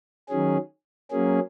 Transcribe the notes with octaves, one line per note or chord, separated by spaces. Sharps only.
D#3 F#3 C#4 G#4
F#3 A#3 C#4 G#4